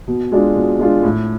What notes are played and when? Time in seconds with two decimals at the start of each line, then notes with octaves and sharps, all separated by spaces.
0.08 B2
0.32 G#3 D4 F4
0.56 B2
0.79 G#3 D4 F4
1.03 A2